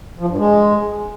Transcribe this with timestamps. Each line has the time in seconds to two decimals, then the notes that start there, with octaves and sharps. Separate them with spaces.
0.19 F3
0.28 G2
0.38 G#3